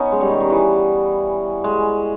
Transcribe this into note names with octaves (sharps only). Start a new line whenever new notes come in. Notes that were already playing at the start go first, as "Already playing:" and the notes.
Already playing: B3 C#4 D#4
G#3
G3
D#3
D#3
E3
G#3